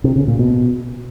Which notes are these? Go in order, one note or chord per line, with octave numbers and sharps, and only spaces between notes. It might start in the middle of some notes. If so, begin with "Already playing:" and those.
C3
C#3
A#2
B2